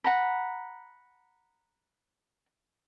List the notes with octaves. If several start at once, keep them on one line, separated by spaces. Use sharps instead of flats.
F#5 A#5 B5